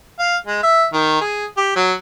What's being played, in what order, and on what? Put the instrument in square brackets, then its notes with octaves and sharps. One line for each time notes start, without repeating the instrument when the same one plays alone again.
[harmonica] F5
G#3
E5
D#3
G#4
G4
F#3